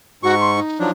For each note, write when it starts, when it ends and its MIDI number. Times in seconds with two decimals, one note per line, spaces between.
0.23 0.60 44
0.23 0.35 66
0.23 0.60 85
0.40 0.50 84
0.56 0.90 63
0.80 0.91 53
0.80 0.91 54
0.80 0.91 62